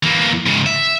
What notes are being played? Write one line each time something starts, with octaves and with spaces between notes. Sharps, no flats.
E3 A#3
G#2 C#3
E5